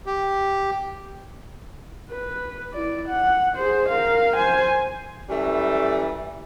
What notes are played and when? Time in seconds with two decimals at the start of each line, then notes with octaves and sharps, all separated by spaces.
0.06 G4
2.10 B4
2.74 E4 D5
3.08 F#5
3.56 G#4 C5
3.89 A#4 F5
4.35 C5 G#5
5.29 F#2 E3 G3 A3